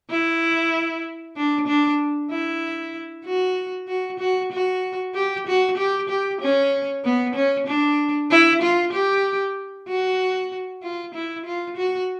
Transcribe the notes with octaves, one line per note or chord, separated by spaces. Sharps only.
E4
D4
D4
E4
F#4
F#4
F#4
F#4
G4
F#4
G4
G4
C#4
B3
C#4
D4
E4
F4
G4
F#4
F4
E4
F4
F#4